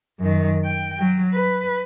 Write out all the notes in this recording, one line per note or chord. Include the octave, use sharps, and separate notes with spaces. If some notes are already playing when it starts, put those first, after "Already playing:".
F#2 D#3
G5
F#3
B4